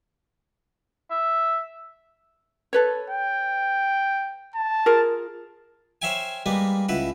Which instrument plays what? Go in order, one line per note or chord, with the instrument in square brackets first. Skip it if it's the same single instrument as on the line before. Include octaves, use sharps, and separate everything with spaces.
[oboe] E5
[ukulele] A4 B4 C#5
[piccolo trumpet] G5
A5
[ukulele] F4 G#4 A#4
[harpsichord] C5 C#5 E5 F5 G5 G#5
G3 G#3 A#3 B4
C#2 E4 B4 F#5